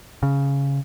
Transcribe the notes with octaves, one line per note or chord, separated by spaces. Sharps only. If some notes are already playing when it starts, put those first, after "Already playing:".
C#3